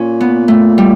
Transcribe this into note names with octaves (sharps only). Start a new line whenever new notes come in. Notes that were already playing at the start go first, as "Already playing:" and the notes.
Already playing: A#2 C#4
B3
A3
G3